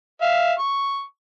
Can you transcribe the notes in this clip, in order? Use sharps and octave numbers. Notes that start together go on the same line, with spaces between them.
E5 F5
C#6